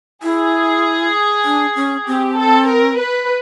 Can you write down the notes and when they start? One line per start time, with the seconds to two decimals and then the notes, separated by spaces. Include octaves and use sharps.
0.23 E4 G#4
1.45 D4
1.76 C#4
2.07 C4 G4
2.37 A4
2.67 A#4
2.99 B4